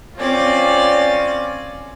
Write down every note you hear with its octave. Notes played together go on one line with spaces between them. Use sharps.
C4 C#4 F4 D5